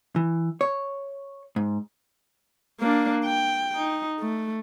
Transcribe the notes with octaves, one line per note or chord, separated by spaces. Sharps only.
E3
C#5
G#2
A#3 D4
G5
D#4
A3